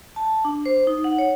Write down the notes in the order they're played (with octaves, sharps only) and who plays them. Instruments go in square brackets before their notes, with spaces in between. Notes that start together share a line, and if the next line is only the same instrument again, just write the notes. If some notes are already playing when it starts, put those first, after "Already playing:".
[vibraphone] A5
D4
C5
D#4
F#5
C#5